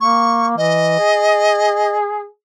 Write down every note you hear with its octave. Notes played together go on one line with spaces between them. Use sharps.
A#3 C#6
E3 D#5
G#4